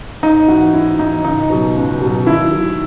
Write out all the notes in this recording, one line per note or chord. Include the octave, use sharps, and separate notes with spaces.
G#2 D#4
E3 F#4
G#2 E4
E3 D#4
C#2 D#4
B2 F#3
C#2
B2
F#3
D#2 E4
D#3 F#3